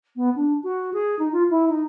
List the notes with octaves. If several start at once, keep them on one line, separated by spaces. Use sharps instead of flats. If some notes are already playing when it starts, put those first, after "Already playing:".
B3
D4
F#4
G#4
D#4
F4
E4
D#4